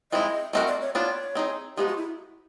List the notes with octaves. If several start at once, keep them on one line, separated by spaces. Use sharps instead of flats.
F3 G#3 C4 E4 D#5
A3 C4 D#4 F#4 A#4 D#5
D5
C#5
B3 D4 F4 C#5
C4 D#4 G#4
F3 G#3 B3 D#4 G4
F#4
E4